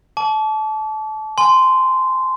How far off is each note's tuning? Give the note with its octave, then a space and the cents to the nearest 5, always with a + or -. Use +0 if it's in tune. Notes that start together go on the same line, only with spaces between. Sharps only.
A5 -25 D6 -40
G#5 +0 C6 -15